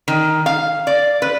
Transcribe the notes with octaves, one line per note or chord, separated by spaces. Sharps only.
D#3
F5
D5
B4